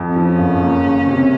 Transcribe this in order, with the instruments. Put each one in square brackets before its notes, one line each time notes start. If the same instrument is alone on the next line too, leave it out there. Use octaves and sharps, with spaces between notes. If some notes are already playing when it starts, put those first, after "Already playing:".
Already playing: [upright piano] F2
[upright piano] F3 [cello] C#4
[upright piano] F#1
A#3
C#3
C3